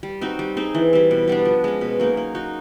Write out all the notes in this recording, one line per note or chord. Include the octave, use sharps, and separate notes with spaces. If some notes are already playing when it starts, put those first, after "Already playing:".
G3
C4 D#4 F#4
G3
C4 D#4 G#4
E3
G3 C4
B2
G3 B3 D4
F3
G#3 C#4
B2
F#3 A#3 D#4
A#3
D#4 F#4